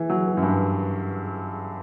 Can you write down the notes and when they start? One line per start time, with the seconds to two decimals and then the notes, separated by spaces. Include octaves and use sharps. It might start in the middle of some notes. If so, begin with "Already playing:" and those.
Already playing: E3
0.10 F#3
0.27 E3
0.37 F#2
0.42 G2